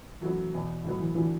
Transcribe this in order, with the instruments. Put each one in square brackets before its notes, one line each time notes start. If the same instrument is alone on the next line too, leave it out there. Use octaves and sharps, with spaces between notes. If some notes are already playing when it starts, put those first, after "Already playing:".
[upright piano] F#2 F#3 A3 F#4 B4 [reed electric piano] E3
[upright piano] E2 B2 B3
[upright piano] A2 F#3 B3 [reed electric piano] D3
[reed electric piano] E3
[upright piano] D3 A3 F#4 [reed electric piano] E3